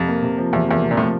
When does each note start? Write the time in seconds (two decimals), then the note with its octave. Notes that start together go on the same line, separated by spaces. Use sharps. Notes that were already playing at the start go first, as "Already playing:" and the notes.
Already playing: F2 C3
0.08 A#3
0.23 C3
0.38 F3
0.53 E2 C3
0.68 E2 A#3
0.84 C3
0.91 A#2
0.97 A2 F3